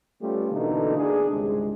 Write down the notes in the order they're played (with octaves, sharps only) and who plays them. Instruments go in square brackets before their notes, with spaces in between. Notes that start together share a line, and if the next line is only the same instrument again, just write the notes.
[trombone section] G3 A3 B3 C#4 F4 G4
B2 D3 E3 A3 A#3 D#4
D4 G#4
G#1 C#2 C3 G3 G#3